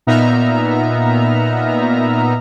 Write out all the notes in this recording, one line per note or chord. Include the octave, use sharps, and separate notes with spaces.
A#2 B3 D#4 E5 A#5 F6